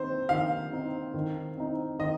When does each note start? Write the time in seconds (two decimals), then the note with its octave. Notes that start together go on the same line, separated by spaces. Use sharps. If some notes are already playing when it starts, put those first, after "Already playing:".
Already playing: D#3 C4 D#4 C5
0.29 D#3 F5
0.72 C4 D#4
1.14 D#3
1.57 C4 D#4
1.99 D#3 D#5